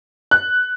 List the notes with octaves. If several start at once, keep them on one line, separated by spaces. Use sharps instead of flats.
F#6